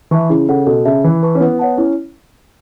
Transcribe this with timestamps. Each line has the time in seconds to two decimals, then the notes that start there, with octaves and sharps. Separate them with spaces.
0.11 E3 E5 A5 C#6
0.30 C#3 E4
0.49 C#3 A4 F#5
0.67 B2 A4
0.85 C#3 E5 A5
1.04 E3 E4
1.23 B4 A5 C#6
1.35 C#4
1.40 B3 E4
1.59 C#5 F#5 A5
1.77 C#4 E4